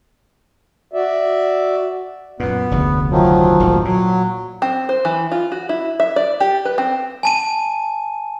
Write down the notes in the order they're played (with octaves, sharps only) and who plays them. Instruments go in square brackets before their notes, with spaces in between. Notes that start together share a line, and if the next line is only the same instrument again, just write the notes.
[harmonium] F#4 D5 E5
[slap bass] F#2 A#2 [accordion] B3
[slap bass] F1 D2 C#3
[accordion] D#3 F3 F#3
[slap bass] D#1 A1 G#2
[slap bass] A#2 [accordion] F#3
[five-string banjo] C4
C5
E3
F4
F#4
E4
E5
D5
G4
B4
C4
[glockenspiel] G#5 A5 D#7